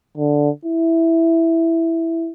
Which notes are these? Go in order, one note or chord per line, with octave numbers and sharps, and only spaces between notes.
D3
E4